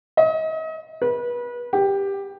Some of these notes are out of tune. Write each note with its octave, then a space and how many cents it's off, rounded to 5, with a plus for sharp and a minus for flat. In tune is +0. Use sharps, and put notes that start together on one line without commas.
D#5 +40
B4 -30
G4 +10